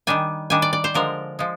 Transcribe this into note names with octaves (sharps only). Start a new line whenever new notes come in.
D#3 G3 D4 G#5
D#3 G3 D4 G#5
D5
D5
C5
D3 F3 G#3 A#4
F3 G#3